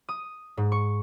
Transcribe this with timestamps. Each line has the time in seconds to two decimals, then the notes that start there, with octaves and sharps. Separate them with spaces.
0.09 D#6
0.57 G#2
0.72 C#6